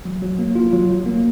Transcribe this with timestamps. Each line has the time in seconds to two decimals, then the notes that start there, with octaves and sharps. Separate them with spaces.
0.05 F#3
0.22 F#3
0.39 A#3
0.55 F4
0.73 F#3
0.90 F#3
1.06 A#3